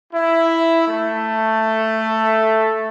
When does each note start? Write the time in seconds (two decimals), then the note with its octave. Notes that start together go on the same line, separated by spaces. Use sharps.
0.10 E4
0.86 A3